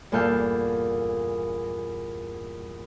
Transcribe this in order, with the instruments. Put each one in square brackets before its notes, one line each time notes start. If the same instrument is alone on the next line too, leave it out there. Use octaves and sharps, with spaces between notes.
[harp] E2 G2 A#2 A4 F5 G6